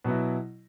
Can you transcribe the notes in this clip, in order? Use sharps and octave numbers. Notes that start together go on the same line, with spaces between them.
B2 F#3 B3 E4